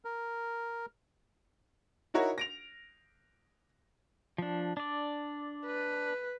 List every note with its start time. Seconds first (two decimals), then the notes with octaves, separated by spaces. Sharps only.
0.05 A#4
2.14 D#4 E4 F#4 A#4 C#5
2.38 A#6 D7 F7
4.38 F3 D4
4.77 D4 D5
5.66 B4